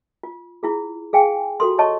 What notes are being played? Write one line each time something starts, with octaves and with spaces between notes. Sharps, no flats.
F4
E4 F4 G#4
G#4 F5 G5 G#5
F4 F#4 A4 C6
C#5 D#5 A5 C#6